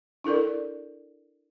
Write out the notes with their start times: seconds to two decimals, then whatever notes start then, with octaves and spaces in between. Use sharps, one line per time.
0.24 D4 E4 A4 A#4 D5